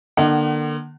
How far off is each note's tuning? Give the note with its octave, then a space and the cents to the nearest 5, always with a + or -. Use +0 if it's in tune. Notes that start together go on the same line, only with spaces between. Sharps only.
D3 +35 A#3 +40 F#5 +40